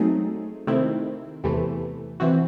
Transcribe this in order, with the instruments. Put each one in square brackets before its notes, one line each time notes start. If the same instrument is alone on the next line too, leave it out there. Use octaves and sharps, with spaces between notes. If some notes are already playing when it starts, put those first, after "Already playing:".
Already playing: [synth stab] F#3 A3 C4 D#4 G#4
C3 D#3 A3 C4 E4
E2 C3 E3 A3
C3 E3 C4 F#4